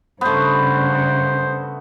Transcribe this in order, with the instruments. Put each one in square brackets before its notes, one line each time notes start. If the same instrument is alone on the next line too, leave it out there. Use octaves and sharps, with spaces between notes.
[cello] G2 C#3 [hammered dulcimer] A3 B3 [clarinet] C5